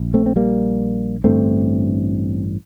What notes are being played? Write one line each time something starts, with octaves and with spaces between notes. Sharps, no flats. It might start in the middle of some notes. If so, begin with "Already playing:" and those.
Already playing: A#1
A3 C4
C4
G3 A#3
A1 G2 D3 A3 C4